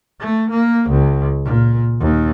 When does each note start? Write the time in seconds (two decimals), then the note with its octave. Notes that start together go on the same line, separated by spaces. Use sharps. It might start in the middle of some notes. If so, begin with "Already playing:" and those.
0.20 A3
0.50 A#3
0.89 C#2
1.45 A#2
1.99 D#2